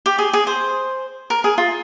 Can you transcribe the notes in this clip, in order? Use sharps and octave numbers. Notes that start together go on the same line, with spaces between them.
G4
G#4
G#4
C5
A#4
G#4
F4